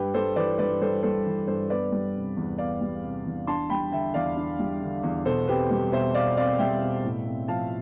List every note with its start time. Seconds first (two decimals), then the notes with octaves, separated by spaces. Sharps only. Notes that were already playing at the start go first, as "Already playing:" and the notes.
Already playing: G2 G4 B4
0.14 G3 A4 C5
0.36 E3 B4 D5
0.58 G2 B4 D5
0.81 G2 A4 C5
1.03 G3 A4 C5
1.26 E3
1.47 G2 A4 C5
1.70 B3 B4 D5
1.92 G3
2.15 C3
2.37 E2
2.58 B3 D5 F5
2.81 G3
3.04 C3
3.26 E2
3.47 D4 A5 C6
3.70 G3 G5 B5
3.92 D3 E5 G5
4.14 E2 D5 F5
4.37 D4
4.59 G3
4.82 D3
5.03 E2
5.25 B2 A4 C5
5.48 C4 G4 B4
5.71 G3
5.92 B2 C5 E5
6.15 B2 D5 F5
6.37 C4 D5 F5
6.59 G3 E5 G5
6.82 B2
7.04 A2
7.26 C4
7.48 F3 F5 A5